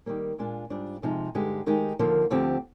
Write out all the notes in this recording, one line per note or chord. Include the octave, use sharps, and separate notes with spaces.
D#3 G3 A#3
A#2 G#3 D4 F4
G#2 G3 D4 F4
F2 C3 F3 G#3 D#4
G2 D3 G#3 D#4 G4
D#3 G#3 D#4 G4
D#2 D3 F3 A#3
D2 D3 F3 C4 G4